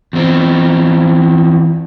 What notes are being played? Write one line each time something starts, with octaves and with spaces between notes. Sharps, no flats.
E2 C4